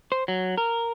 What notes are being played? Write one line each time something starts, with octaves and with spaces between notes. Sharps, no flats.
C5
F#3
A#4